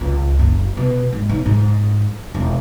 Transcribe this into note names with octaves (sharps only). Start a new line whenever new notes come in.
C#2
F#1
B2
G#2
B1
G#2
E1